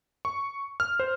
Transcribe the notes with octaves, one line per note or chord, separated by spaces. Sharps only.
C#6
F6
C5